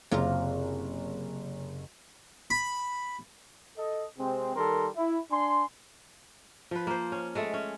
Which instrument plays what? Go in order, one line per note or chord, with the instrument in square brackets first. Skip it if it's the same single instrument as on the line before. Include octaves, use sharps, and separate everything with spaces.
[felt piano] F#1 [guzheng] C3 F4 A#4
[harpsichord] B5
[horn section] A4 D#5
C3 G#3 C4
D#3 G3 A4 A#4 C6
E4
D4 G#5 C6
[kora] F3 B4
A#3 C5
C#4
G#3 A3 A4
C#4